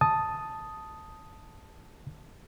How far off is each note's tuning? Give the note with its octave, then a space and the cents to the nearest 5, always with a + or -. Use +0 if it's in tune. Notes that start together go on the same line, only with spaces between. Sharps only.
A5 +0 D#6 +0